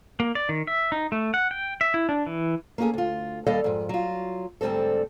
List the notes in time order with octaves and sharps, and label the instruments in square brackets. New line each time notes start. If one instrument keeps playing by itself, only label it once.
[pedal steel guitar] A#3
D5
D#3
E5
D#4
A3
F#5
G5
E5
E4
D4
E3
[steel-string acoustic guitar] A#3 C#4 F#4 G#4 A4
D2 F4
D#2 G3 A4 D5 D#5 F5
F2 G#2
F#3 F4
D2 G#2 G3 C4 A4